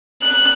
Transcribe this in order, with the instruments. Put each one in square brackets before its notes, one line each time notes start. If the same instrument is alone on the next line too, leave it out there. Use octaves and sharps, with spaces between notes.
[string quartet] F#6